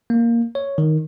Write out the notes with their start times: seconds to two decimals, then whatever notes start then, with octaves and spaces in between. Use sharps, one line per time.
0.10 A#3
0.55 C#5
0.78 D#3